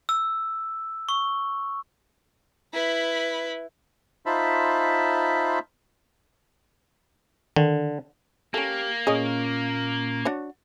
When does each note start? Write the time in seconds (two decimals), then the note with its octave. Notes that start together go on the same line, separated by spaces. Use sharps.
0.09 E6
1.09 C#6
2.73 E4 B4
4.26 D#4 F4 C5 E5 A5 B5
7.56 D3 D#3
8.54 A#3 C#4 G4 A4
9.07 A#2 C#4 G#4 C#5 D#5
10.25 D4 F#4 C#5